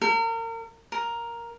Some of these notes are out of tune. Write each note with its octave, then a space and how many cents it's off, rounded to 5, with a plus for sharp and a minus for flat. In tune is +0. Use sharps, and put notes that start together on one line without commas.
A#4 -35
A#4 +5